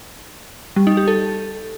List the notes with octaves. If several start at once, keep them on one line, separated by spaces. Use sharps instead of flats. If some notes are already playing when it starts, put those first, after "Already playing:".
G3
D#4
G4
A4